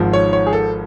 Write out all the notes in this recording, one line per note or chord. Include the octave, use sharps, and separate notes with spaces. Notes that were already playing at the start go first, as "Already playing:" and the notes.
Already playing: G#1 G#2 F3
C#5
C#5
G#4
A4